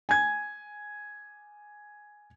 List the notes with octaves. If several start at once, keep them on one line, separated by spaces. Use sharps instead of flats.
G#5 G#6